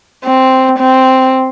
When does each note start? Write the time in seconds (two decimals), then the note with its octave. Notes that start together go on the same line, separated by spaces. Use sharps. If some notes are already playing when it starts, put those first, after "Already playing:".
0.25 C4
0.79 C4